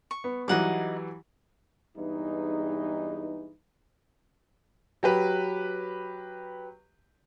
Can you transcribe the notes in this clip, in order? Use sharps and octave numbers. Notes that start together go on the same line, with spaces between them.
C#6
B3
E3 F#3 G3 D#4 F#5 D6
E2 G2 E3 G#3 D#4
F#3 G4 B4